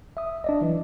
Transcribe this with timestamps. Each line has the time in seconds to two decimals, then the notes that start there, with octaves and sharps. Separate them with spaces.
0.17 E5 D#6
0.44 D4 D5 D#5
0.61 E3 F#3